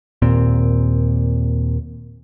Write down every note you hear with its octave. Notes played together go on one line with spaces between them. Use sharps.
D#2 A#2 C4